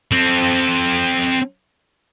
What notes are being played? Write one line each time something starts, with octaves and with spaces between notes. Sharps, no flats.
C4 A4